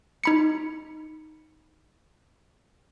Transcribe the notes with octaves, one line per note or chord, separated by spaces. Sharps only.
D#4 B5 C#7